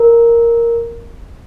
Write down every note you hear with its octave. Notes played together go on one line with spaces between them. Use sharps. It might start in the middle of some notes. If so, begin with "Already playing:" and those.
Already playing: A#4